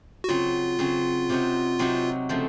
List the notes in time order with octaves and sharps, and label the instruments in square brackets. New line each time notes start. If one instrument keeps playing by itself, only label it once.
[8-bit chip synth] F#4
[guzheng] C#3 F#3 C4 [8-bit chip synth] F4
[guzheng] C#3 F#3 C4
C3 F#3 C4 D#4 F#4
C3 F#3 C4 D#4 F#4
C#3 F3 A3 C4